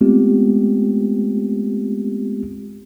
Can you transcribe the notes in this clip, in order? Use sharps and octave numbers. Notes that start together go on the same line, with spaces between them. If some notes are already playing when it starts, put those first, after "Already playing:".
G#3 A3 B3 C4 F4 G4